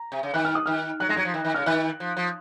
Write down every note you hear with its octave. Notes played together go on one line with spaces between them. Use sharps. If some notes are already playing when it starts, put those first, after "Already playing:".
Already playing: A#5
C3
C#3
D#3 F#6
F6
D#6
D#3 F6
F#3 F#6
G#3 A#6
F#3 G#6
F3
D#3
D#3
C#3 F6
D#3 F#6
F3
F3